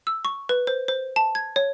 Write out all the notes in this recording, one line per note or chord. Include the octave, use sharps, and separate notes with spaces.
E6
C#6
B4
C5
C5
A5
G#6
C#5